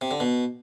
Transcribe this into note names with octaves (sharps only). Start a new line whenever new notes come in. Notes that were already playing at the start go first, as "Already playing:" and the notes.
C3
D3
B2